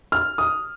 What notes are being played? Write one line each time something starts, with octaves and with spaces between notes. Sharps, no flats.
F6
D#6